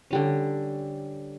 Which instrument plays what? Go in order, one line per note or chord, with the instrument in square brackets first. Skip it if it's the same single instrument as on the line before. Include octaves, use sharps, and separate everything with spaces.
[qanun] D3 G3 C#4